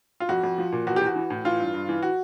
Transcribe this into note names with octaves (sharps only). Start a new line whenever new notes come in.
F4
F2 F#4
F2
F3
A#2
E2 F#4
G4
E2
F#4
E3
A2
E3 F4
G2
G2
E3
F#4